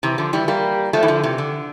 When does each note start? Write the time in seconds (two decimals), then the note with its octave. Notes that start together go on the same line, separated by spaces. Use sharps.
0.03 C3 E3
0.18 D3 F3
0.33 E3 G3
0.48 G3 A#3
0.93 F3 A3
1.03 E3
1.08 D3 F3
1.24 C3 E3
1.38 D3